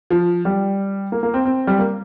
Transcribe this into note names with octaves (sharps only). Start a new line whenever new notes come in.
F3
G3
A#3
A#3
C4
C4
G3
A#3